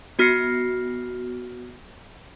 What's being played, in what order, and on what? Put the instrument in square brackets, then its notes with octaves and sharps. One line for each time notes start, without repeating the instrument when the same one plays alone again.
[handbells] B3 F#4 F6 A#6 C7 C#7